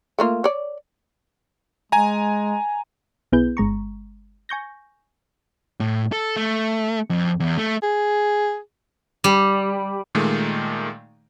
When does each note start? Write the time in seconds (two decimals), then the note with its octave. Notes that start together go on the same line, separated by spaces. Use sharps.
0.19 A3 A#3 F4
0.44 C#5 D5
1.92 G#3 G#5 A#5
3.32 B1 B3 E4 G#4 B4 G6
3.57 G1 G#3 A#5 C#6
4.49 G#5 C#6 G6 A#6
5.80 A2
6.12 A4
6.36 A3
7.10 F2
7.40 E2
7.58 A3
7.82 G#4
9.24 G3
10.15 A#2 D#3 G#3 A3